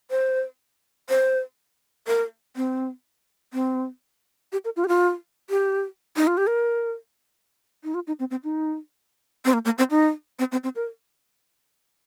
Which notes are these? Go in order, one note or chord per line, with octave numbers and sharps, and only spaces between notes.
C5
C5
A#4
C4
C4
G4
A#4
F4
G4
F4
G4
D#4
F4
G4
A#4
D#4
F4
D#4
C4
C4
D#4
C4
A#3
A#3
C4
D#4
C4
C4
C4
A#4